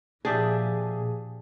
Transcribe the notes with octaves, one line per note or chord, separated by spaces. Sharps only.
A#2 F3 D4 G4 G#4 E5